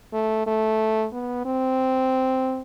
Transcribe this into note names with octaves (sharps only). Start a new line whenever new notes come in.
A3
A3
B3
C4